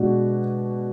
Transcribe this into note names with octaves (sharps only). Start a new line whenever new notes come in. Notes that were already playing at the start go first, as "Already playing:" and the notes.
Already playing: B2 G#3 D4 F#4